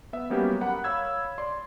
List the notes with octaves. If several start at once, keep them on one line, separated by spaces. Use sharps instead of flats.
B3 E5
F#3 G3 A#3 B3 C#4 G4
A#4 F#5 A#5 B5
C#5 F5 B5 E6 G#6
D5 C6